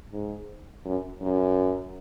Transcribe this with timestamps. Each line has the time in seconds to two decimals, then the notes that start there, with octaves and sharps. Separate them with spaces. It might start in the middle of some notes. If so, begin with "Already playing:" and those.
0.12 G#2
0.85 F#2
1.21 F#2